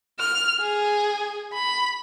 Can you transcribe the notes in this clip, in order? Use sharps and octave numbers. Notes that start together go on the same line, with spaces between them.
F6
G#4
B5